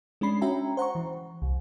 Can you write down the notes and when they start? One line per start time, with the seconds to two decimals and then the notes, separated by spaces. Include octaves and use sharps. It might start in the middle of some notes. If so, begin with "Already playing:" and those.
0.21 G#3 C#4 D4 B5 C7
0.41 C#4 F#4 E5 G5 A#5
0.77 C5 F#5 A#5 C#6
0.95 E3
1.42 C2